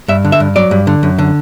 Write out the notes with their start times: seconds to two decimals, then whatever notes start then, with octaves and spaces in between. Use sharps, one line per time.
0.08 G2 E5
0.25 D3
0.32 E5
0.40 G2
0.56 F#3 D5
0.71 G2
0.87 D3
1.03 F#2
1.18 D3